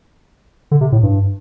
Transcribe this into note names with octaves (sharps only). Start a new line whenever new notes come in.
D3
C3
A2
G2